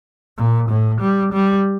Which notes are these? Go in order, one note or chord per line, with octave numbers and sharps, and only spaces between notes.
A#2
A2
G3
G3